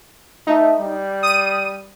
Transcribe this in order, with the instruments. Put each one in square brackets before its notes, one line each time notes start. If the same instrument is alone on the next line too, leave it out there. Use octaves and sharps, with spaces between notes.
[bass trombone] A3 [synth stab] D#4
[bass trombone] G3
[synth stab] D#6 D#7